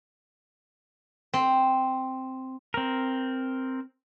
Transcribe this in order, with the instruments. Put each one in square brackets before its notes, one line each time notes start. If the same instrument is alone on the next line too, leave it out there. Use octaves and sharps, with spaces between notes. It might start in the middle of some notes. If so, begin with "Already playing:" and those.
[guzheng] C4
[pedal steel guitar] C4 A#4